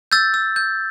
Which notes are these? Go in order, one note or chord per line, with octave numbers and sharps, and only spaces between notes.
E6 G6 A6
E6
G6